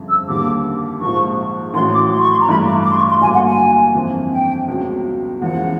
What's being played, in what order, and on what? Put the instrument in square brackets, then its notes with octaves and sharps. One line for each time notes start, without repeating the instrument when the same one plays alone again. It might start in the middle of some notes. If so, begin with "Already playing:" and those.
Already playing: [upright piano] G1 F2 C#3
[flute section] E6
[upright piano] D#2 D3 G3 A#3 [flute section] D6
[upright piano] A#1 G#2 F3 [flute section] C#6
[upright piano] A1 A2 F#3 [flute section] C6
[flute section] D6
C6
C#6
C6
A#5
[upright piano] G2 E3 A3 [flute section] B5
[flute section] D6
D6
C6
C#6
C6
[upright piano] G2 D3 F#3 A#3 [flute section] G#5
[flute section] F#5
G#5
[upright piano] G1 F2 C3 E3
[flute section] G5
[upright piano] C#2 B2 F#3
[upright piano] F#1 E2 C#3 F3 G#3 [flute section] F#5